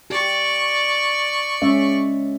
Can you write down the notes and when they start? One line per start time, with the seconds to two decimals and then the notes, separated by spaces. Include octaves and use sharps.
0.10 G4 D5 C#6
1.62 G#3 C#4 E5